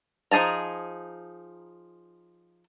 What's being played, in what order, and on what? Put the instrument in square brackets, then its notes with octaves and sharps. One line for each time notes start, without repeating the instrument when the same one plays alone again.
[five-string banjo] F3 D#4 G#4 A5 A#5